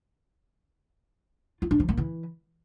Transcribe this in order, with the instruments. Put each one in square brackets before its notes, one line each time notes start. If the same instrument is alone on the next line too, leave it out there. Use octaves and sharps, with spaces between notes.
[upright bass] F4
D4
F3
A#3
E3